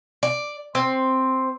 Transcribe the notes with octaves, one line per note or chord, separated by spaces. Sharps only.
D5
C4